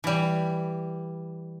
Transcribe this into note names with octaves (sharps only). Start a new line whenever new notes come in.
E3 G3